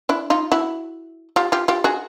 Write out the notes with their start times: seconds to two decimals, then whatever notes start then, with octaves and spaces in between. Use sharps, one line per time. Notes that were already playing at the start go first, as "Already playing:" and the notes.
0.09 D4 E4
0.30 D#4 F4
0.52 E4 F#4
1.36 F4 G4
1.52 F4 G4
1.68 F4 G4
1.84 F#4 G#4